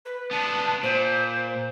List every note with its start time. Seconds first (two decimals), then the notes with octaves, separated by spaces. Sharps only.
0.05 B4
0.31 B3 D4 A5
0.83 A#2 C5